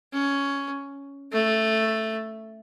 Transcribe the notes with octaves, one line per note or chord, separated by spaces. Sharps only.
C#4
A3